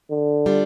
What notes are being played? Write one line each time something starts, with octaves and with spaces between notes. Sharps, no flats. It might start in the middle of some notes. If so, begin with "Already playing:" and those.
D3
G3 D4 F4